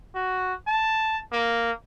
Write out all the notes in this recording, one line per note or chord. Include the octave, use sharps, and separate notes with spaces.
F#4
A5
A#3